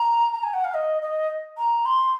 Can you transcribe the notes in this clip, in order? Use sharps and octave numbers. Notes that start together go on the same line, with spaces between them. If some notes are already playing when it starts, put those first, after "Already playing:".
Already playing: A#5
A#5
G#5
F#5
F5
D#5
D#5
A#5
C6